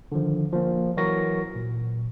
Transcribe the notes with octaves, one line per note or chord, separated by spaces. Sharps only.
D3 D#3 F3
F3 A#3
E3 F#3 F#4 A#4 C#6 A#6
A#2